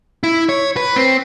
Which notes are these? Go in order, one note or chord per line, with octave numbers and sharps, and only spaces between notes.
E4
C#5
B4
C4